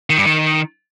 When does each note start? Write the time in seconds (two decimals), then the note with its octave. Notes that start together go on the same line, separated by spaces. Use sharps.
0.10 D#3
0.18 G2
0.25 D#3